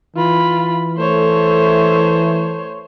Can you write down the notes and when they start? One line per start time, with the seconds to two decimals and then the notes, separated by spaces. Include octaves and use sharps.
0.16 E3 F4 B5
0.98 A3 A4 C5 C#5